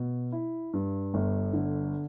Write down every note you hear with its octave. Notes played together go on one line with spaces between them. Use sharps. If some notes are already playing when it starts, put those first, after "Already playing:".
Already playing: B2
E4
G2
G1
D3